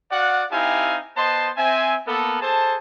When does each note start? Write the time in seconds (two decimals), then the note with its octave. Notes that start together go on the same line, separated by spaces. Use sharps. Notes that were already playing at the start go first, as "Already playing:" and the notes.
0.12 F#4 D5 F5 F#5
0.52 C4 D#4 E4 G4 F5 G#5
1.17 B3 C5 D#5 A5 C6
1.57 C4 E5 G#5
2.07 A#3 B3 A4
2.41 G#4 A4 C5 A5